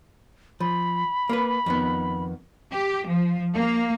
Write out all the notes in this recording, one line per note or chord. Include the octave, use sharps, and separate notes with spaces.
F3 B5
A#3 A#4 B4
F2 D#3 B3
G4
F3
A#3